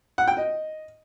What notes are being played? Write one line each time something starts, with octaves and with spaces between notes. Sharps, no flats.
F#5
G5
D#5